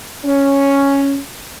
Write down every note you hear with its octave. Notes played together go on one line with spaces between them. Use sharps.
C#4